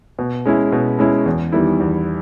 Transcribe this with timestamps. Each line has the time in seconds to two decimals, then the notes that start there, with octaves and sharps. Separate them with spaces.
0.19 B2
0.45 G#3 C#4 E4
0.72 B2
0.99 G#3 C#4 E4
1.26 E2
1.52 D#3 G3 B3 E4
1.80 E2